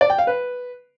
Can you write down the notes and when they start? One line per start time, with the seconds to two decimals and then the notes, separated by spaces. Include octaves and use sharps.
0.01 D5
0.10 G5
0.18 F5
0.27 B4